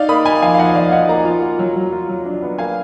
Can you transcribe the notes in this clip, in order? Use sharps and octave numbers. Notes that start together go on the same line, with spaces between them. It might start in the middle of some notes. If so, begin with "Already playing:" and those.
Already playing: D#4 D5 F5
A#3 B5 D#6
D#4 G#5 B5
F3 F5 G#5
F5
F3 D#5 F#5
F3 D5 F5
D#4 D#5 F#5
A#3 F#5 A#5
F4
F4
F#3
F#3
F4
F#3
D4
B3
A#3 F5 G#5